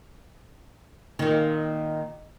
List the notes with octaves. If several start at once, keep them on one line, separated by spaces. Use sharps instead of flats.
A#2 D#3